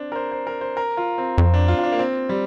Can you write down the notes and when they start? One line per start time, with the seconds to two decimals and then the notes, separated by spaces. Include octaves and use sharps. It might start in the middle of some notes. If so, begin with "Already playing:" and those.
Already playing: C4 D4
0.12 A#4
0.16 C5
0.31 C5
0.47 A#4
0.61 C5
0.77 A#4
0.97 F4
1.18 C4
1.38 F2 C4
1.54 D4
1.68 F4
1.78 F4
1.83 D4
1.92 A#3
1.99 C4
2.29 G3